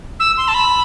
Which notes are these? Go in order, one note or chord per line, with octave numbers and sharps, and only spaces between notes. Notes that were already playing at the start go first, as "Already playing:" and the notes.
E6
C6
A5
B5